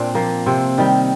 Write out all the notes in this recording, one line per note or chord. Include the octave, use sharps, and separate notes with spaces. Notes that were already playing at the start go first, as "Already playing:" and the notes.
Already playing: A#2 C4 D4
F3 A#3
C3 C4
D#3 G3